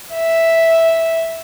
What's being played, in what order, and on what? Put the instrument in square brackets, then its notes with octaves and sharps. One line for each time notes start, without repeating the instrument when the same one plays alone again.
[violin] E5